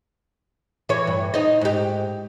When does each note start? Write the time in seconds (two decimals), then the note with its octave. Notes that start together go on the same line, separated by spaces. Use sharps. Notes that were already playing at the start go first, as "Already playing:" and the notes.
0.89 E3 C#5
1.07 G2
1.34 D#4 C5 D#5
1.61 G#2 G4